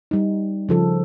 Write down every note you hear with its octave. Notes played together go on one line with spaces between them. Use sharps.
G3 D#4
C#3 F3 A4